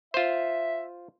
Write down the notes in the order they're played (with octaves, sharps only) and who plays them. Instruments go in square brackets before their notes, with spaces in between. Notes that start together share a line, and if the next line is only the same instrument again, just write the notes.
[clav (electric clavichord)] F4 C5 [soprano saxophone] E5